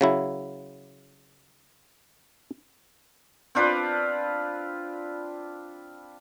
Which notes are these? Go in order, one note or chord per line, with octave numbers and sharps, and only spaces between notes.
C#3 F#3 E4
C4 D4 F4 B4